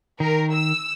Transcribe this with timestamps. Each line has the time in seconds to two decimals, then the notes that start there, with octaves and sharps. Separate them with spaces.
0.20 D#3 A#4
0.52 E6